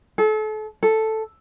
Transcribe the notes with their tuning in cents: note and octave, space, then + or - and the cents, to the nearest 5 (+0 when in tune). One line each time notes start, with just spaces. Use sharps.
A4 -35
A4 +0